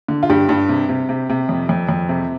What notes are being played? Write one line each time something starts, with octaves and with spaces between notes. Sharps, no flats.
D3
F4
G2 G4
G2
C3
C3
C3
C3
F2
F2
F2
C3